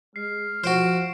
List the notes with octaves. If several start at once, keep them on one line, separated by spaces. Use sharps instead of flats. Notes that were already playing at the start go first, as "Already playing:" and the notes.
G#3 F6 C7
F3 F#4 C5 D7 E7